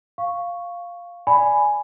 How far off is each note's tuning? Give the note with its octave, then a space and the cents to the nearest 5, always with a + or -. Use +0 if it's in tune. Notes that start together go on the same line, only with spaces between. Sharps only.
F5 +0 C#6 +0
D5 +0 G#5 +0 B5 +5